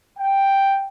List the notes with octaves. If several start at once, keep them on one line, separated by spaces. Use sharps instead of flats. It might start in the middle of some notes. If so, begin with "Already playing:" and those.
G5